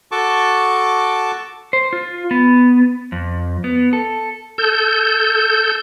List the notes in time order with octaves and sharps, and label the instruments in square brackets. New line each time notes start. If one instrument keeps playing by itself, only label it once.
[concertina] F#4 A4 A5 C#6 D6
[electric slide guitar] C5
F4
B3
F2
B3
A4
[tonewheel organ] A4 G6